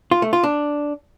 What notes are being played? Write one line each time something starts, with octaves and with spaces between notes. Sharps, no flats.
F4
A3
F4
D4